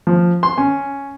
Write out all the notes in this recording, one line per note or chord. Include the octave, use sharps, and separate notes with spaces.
F3
C6
C#4